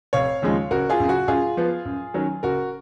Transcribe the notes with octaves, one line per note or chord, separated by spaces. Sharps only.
F1 C#5 F5
D#2 C#3 F3 G#3
F#1 F#4 A#4
F4 G#4
F#2 C#3
F#4
F#2 F4 G#4
F3 B3
F#2
D#3 F#3 C#4
F#1 F#4 A#4